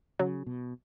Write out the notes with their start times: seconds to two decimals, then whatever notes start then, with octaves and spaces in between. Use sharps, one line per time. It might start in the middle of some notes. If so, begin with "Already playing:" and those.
0.19 C#3 F#3
0.46 B2